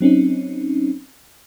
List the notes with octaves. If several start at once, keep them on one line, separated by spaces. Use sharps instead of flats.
F#3 C4 C#4 D#4